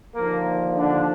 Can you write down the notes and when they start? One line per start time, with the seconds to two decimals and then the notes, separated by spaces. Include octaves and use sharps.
0.14 D#2 D3 F3 A#3 A#4
0.75 D3 D4